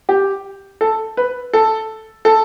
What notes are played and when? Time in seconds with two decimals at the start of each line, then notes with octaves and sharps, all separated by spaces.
0.09 G4
0.81 A4
1.17 B4
1.53 A4
2.25 A4